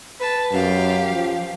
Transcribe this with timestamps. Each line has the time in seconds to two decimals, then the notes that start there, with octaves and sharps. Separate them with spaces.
0.20 B4 A5
0.52 F#2 G4 F5
1.11 F3